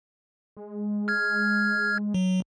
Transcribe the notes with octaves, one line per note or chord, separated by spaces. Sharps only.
G#3
F6 G#6
F#3